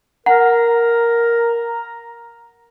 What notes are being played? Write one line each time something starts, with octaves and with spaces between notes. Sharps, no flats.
A#4 F#5 A#5